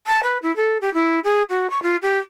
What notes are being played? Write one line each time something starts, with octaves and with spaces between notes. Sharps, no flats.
A5
B4
E4
A4
G4
E4
G#4
F#4
C#6
F4
G4